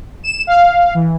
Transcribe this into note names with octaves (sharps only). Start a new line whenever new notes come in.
E7
F5
E3